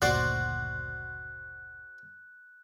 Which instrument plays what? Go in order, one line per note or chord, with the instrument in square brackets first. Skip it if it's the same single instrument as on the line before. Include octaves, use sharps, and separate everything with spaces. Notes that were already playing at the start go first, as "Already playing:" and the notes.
[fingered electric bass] F#1 D2 A#2 [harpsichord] F#4 C5 D5 [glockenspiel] F#6